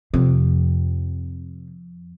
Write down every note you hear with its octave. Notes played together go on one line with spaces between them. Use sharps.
F2 C3